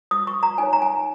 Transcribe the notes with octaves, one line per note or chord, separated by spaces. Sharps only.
D#6
C#6
A#5
D#4 A#4 C#5 G#5
A#5
G#5